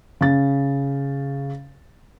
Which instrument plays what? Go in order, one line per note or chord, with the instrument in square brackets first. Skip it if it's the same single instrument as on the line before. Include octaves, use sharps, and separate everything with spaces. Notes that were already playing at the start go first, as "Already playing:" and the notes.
[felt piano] C#3 A6